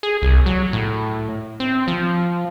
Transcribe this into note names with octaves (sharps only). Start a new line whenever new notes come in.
G#4
C2
F#3
A2
C4
F3